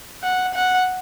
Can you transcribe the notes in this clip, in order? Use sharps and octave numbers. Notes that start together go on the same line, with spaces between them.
F#5
F#5